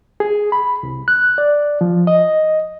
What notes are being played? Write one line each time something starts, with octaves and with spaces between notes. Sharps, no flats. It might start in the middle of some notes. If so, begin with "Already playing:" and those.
G#4
B5
C2
F#6
D5
F3
D#5